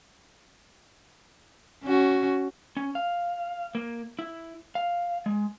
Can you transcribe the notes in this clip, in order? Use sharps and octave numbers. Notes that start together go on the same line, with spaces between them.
C#4 F#4
C#4
F5
A#3
E4
F5
G#3